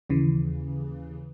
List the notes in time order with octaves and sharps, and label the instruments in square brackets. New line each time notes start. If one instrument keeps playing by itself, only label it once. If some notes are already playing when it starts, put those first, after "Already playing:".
[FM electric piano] D#2 C#3 E3